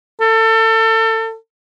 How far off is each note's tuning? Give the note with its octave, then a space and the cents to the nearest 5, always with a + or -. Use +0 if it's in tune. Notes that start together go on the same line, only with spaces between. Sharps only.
A4 +30